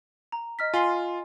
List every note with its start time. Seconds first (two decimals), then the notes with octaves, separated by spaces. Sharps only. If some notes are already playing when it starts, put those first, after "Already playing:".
0.32 A#5
0.59 D#5 F6 B6
0.74 F4 G#5 C6 C7